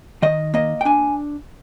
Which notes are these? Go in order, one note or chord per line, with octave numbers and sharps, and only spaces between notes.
D#3 D#5
A#3 D#5
G5
D4 G#5